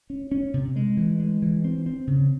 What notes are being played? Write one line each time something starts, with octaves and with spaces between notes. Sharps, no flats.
C#4
C#4
C3
G#3
E3
G#3
E3
C4
C4
C#3